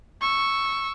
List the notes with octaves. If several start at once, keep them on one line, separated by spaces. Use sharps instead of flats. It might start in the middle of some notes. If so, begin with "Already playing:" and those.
C#6 E6